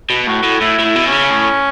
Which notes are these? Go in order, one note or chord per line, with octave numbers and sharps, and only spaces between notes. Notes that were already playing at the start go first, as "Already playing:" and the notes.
B2
A2 F#4
A2
A2 E4
A2 E4
B2
C#3 C#4
A2